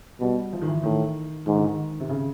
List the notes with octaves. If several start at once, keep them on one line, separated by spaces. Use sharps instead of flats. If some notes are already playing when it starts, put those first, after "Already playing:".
B2 G3
F3
D#3
E3
A2 D#3
G#2 D#3
D3
D#3
C3
C#3